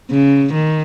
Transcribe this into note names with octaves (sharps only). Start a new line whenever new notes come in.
C#3
D#3